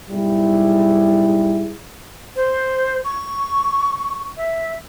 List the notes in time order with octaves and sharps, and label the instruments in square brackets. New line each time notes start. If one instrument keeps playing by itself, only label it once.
[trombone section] B1 G#2 G3 E4 G#4
[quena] C5
C#6
E5